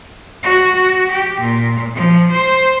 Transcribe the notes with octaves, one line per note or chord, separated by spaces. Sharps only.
F#4
F#4
G4
A#2
F3
C5